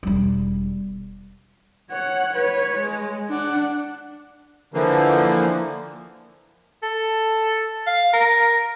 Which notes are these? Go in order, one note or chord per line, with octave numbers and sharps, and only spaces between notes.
E1 G3
C#5 F#5
B4 C#5
G#3
D4 F#5
D3 E3 F3 A#3
A4
F5
A#4